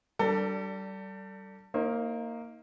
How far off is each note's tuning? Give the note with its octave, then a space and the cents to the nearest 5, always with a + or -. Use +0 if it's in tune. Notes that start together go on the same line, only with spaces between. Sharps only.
G3 -25 D4 +0 A4 +25
A#3 -10 D#4 +25 C5 +40